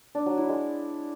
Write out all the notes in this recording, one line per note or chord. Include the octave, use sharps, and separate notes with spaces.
D4
F#3
E4
G#3